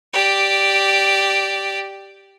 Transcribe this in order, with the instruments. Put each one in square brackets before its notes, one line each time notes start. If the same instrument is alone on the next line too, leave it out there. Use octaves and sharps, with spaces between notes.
[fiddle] G4 D5